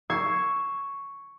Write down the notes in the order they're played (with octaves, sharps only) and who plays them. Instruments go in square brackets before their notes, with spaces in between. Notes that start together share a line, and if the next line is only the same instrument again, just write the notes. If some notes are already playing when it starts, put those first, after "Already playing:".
[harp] C#6 E6 G#6 C7 C#7